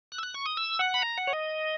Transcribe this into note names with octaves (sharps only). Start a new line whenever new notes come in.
F#6
E6
F#6
C#6
D#6
E6
F#5
B5
A#5
F#5
C#5
D#5